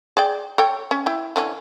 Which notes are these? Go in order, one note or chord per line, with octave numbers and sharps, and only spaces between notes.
G#4 D5 G5
A4 C#5 G5
C#4
E4 G5
D3 E3 C#4